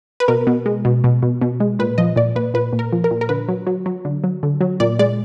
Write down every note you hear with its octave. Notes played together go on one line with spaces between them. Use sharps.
B4
B2 A#4
B2
G#3
B2
B2
B2
B2
G#3
A#2 B4
F3 D#5
A#2 D5
A#2 B4
A#2 B4
A#2
A#4
F3
A#4
A#2
A#4
D3 B4
F#3
F#3
F#3
D3
F#3
D3
F#3
A#2 D5
G#3 D5